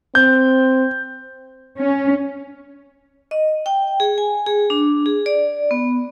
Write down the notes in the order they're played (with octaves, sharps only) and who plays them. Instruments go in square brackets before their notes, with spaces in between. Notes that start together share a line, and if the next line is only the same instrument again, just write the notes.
[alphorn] C4 [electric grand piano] G6
[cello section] C#4
[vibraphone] D#5
G5
G#4
G#5
G#4
D4
G#4
D5
B3